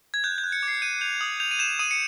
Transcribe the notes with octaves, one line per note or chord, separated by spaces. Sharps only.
G#6
F#6 G6
G6
F#6
C#7
D6
C7
G6 D#7
G6 F7
D#6
G6 F7
D#7
G6 E7
D#6 D#7
C#7